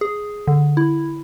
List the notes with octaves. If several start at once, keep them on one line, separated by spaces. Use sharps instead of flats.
G#4
D3
E4